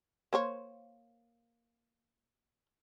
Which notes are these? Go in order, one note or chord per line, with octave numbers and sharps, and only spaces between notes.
A#3 C5 C#5